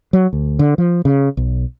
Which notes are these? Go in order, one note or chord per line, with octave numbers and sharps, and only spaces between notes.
F#3
D2
D3
F3
C#3
B1